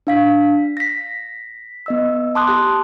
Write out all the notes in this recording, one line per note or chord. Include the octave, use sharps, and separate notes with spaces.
D4 F5 B6
A#6 B6
B3 D#5 E6
A5 C6 D6 D#6 F#6
G4